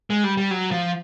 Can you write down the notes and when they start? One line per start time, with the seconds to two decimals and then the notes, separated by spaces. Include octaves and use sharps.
0.10 G#3
0.24 G3
0.37 G3
0.51 F#3
0.71 F3